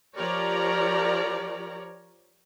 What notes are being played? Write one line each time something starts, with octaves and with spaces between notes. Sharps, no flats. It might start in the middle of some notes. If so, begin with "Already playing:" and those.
F3 G4 A#4 C#5 D5 A#5